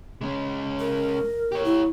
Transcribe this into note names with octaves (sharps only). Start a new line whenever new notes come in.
G#3 C#4
A#4
G4 C#5
E4